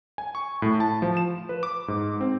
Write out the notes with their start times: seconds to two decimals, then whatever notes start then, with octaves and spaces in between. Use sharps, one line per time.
0.18 G#5
0.35 C#6
0.62 A2
0.80 A5
1.02 F3
1.17 E7
1.49 B4
1.63 D6
1.88 G#2
2.21 C4